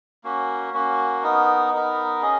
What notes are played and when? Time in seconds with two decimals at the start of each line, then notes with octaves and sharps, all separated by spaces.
0.24 A#3 C#4 F#4
0.74 A#3 C#4 F#4
1.23 B3 D#4 A#4
1.73 B3 D#4 A#4
2.22 C#4 G#4 D#5